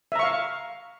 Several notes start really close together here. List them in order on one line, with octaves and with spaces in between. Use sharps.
E5 A#5 C#6 F5